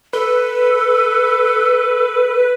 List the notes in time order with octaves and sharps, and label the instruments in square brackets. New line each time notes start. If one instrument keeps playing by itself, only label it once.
[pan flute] A4 [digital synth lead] B4